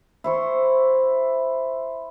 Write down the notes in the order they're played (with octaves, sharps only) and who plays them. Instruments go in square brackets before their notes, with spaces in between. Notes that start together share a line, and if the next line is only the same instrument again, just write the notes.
[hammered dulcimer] E4 C5 C#6